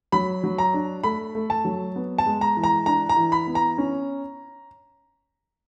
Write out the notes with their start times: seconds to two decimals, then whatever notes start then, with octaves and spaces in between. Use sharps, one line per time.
0.12 F#3 B5
0.44 F#3
0.58 A#5
0.74 D4
1.03 A3 B5
1.35 A3
1.50 A5
1.65 F#3
1.96 B3
2.18 A5
2.26 G#3
2.41 A#5
2.57 E3
2.63 A#5
2.86 D4 A#5
3.09 A#5
3.16 E3
3.32 B5
3.47 B3
3.55 A#5
3.78 C#4